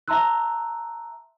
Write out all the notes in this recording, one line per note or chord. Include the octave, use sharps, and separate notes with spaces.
E5 A5 A#5 C6 E6 F#6